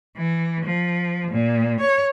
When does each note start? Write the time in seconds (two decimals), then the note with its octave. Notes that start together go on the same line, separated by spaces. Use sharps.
0.16 E3
0.64 F3
1.30 A#2
1.80 C#5